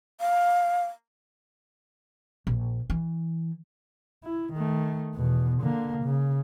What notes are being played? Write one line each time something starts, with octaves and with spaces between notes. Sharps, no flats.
F5
A#1
E3
E4
D#3 A3
E2 B2
D3 A#3
C#3